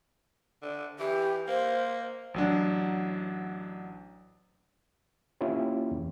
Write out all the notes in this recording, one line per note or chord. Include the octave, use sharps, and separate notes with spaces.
D3
E3 G4
A#3 C5
A1 F#3 D4
A#3 C#4 E4 F4 G4
E2